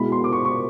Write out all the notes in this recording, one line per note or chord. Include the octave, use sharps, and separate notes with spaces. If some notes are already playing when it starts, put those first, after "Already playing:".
Already playing: B2 G#3 B3 E4 B5
C6
D6
C#6
C#6